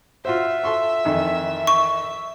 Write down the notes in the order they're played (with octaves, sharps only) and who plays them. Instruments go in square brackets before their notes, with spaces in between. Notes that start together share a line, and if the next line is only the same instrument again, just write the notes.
[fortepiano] F4 F#4 C5 [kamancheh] E5
[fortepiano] A4 C6 C#6
F2 D#3 E3
[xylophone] C#6